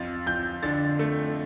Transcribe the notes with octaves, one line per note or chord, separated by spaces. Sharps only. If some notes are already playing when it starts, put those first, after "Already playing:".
Already playing: F2 A6
F2 G6
D3 A6
A3